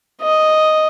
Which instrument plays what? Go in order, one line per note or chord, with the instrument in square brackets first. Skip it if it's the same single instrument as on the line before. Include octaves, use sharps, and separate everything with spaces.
[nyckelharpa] D#5